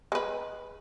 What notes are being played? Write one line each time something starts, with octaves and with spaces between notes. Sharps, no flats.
G#3 B4